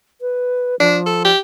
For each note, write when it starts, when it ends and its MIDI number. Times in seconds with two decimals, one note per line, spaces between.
0.21 0.75 71
0.80 1.32 53
0.80 0.98 62
1.06 1.23 69
1.25 1.39 67